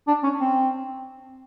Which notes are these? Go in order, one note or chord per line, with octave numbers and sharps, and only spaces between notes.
D4
C#4
C4